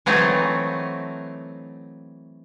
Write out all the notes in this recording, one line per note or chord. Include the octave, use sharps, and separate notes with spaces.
E3 F#3 A3 C4 D#4